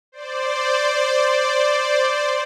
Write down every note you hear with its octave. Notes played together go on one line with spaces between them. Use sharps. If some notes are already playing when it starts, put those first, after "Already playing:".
C5 D5